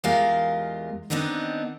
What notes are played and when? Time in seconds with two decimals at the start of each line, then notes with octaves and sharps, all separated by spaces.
0.04 E2 G#3 F4 G4 A#4 F5
1.10 D#3 B3 C4 D4 D#4